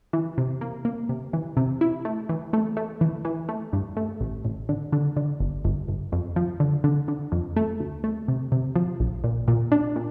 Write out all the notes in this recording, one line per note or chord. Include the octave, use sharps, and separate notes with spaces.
E3
C3
A#3
A#3
C3
E3
C3
E4
A3
E3
A3
A3
E3
E3
A3
G2
A3
A1
A1
D3
D3
D3
G1
G1
G1
F2
F3
D3
D3
D3
F2
A3
D2
A3
C3
C3
F3
A#1
A#2
A#2
D4
A#2